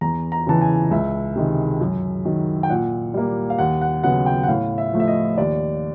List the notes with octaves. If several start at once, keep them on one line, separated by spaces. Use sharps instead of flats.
E2 A#5
A#5
C#3 E3 A5
G#5
C#2 E5
C3 D#3 G#3
F#2
D#3 F#3
G5
A#2 F#5
G3 A#3
F5
D#2 F#5
F#5
C#3 F#3 B3 F#5
G5
F#5
A2 F5
E5
F3 A3
E5
D#5
D#2 D5